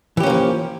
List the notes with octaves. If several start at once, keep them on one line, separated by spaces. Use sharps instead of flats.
E3 F3 A#3 C#4 G4